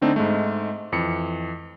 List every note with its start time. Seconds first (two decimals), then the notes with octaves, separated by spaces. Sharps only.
0.01 D3 A3 C4 D4 D#4
0.16 G#2 G#3 A3
0.92 F2 E3 C#7